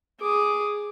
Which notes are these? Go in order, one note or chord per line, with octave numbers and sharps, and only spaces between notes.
G#4 D6